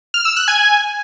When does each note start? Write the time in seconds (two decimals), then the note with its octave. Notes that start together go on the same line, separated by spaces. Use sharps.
0.14 F6
0.25 E6
0.36 F#6
0.48 G#5